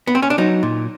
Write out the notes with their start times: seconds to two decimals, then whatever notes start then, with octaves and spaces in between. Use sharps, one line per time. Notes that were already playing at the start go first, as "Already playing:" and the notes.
0.07 B3
0.15 C4
0.22 C#4
0.30 D4
0.38 F#3 D#4
0.63 A#2